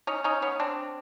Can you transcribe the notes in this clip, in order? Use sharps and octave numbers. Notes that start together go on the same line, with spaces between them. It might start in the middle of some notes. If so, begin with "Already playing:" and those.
C#4 D#4
C#4 D#4
B3 C#4
C4 D4